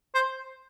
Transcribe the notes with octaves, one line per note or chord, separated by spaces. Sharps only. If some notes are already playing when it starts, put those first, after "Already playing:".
C5